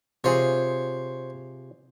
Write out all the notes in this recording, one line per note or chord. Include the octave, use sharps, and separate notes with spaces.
C3 F4 G#4 C5 C#5